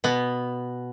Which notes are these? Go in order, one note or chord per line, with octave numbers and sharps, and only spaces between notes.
B2 B3